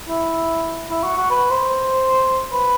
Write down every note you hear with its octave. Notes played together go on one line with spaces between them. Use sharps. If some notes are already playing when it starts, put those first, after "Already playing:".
E4
E4
F#4
F#4
B4
C5
B4